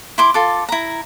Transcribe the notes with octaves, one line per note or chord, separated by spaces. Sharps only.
E4 C6 D6
F4 A4 D6
E4 A#5